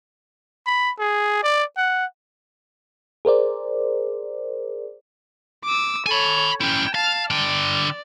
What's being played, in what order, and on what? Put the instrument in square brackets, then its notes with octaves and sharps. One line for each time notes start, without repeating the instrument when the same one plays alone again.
[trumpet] B5
G#4
D5
F#5
[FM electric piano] G#4 A#4 C5 D5
[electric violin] D6 E6
[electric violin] A4 C#5 [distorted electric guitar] G#5 B5
[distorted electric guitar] C#4 E4 [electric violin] G5
[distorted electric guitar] F5 [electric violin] A5
[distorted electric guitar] D3 G5 [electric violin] D5